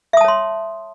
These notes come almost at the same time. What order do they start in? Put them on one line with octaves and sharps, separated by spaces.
E5 D#6 A5 C#5 C6